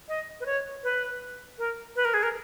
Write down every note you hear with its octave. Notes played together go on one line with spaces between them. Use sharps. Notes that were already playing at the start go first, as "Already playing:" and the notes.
D#5
B4
C#5
B4
A#4
B4
A#4
G#4
A#4